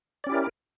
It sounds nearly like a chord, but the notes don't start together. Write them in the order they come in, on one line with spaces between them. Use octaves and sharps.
D5 C#4 G4 E4 A#4